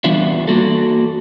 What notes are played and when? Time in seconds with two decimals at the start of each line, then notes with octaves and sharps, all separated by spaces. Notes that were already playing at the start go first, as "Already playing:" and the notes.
0.04 E3 G3 B3 D4 F4 E5
0.47 A#3 F#4 A4